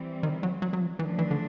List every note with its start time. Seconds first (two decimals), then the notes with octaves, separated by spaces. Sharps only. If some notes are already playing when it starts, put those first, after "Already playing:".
Already playing: E3 G3 C4
0.23 D#3
0.43 F#3
0.62 F#3
0.73 F#3
0.81 F3
0.99 C#3 E3 F3 A3 D4
1.19 E3
1.31 D3